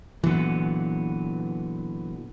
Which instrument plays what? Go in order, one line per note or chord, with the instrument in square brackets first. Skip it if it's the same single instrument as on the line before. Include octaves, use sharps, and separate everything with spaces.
[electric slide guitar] A#2 D3 B3 [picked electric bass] E3 F#3